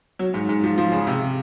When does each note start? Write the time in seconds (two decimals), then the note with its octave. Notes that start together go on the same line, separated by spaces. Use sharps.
0.19 F#3
0.34 G#2
0.49 G#2
0.64 F3
0.78 F3
0.92 C#3
1.07 C3